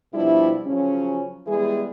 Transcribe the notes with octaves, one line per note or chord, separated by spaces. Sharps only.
B2 F3 G3 D4 E4
C#3 F3 F#3 C#4
E3 G3 G#3 B3 G#4